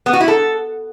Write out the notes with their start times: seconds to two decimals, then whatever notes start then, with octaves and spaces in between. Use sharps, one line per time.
0.06 B3
0.13 F#4
0.21 E4
0.28 A4